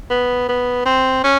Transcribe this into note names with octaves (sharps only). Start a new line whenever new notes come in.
B3
B3
C4
C#4